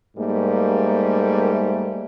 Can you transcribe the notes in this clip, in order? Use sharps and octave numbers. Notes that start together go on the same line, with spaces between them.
G#2 G3 A3 A#3